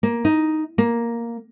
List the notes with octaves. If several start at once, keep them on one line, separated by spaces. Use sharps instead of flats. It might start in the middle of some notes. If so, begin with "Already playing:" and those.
A#3
D#4
A#3